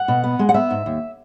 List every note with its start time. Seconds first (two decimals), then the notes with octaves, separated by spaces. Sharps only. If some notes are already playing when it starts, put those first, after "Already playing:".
Already playing: F#5
0.08 B2
0.24 B3
0.39 G#3
0.49 F#5
0.54 B3 E5
0.70 G#2
0.86 D#2